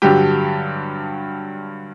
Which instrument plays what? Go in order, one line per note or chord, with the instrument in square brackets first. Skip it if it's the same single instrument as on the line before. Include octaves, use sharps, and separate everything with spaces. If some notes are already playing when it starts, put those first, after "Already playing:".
[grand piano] G2 D3 F#3 G4